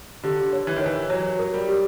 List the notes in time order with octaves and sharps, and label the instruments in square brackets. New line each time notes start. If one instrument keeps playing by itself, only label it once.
[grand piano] D3 [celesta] G4
[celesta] C#5
[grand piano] E3
D#3
[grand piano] E3 [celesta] C#5
[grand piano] F#3 [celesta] C#5
[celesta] A#4
[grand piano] G3
[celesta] G4